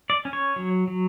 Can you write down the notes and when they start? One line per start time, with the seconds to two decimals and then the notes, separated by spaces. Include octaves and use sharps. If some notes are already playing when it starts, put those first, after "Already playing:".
0.10 D5
0.25 C#4
0.33 C#5
0.56 F#3
0.88 F#3